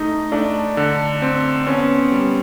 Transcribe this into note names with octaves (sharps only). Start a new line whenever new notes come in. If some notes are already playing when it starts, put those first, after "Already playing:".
Already playing: A3 D#4
A3 D4
D3
C4
B3 C#4
G3